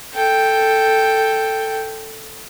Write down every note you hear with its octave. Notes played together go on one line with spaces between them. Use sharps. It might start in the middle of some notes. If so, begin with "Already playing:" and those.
A4 G5